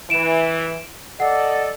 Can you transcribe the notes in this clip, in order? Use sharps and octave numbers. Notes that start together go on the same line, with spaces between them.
E3 D7 E7
A4 D5 D#5 F#5